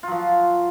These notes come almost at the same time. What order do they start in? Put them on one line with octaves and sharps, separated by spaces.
F4 F#3 F3